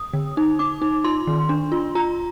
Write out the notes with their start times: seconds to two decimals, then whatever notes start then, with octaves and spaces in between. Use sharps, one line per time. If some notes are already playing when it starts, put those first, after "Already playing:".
Already playing: D#6
0.14 D3
0.37 D#4
0.59 D#4 D6
0.82 D#4
1.04 F4 C6
1.27 D#3
1.49 D4
1.72 F4
1.95 F4 A#5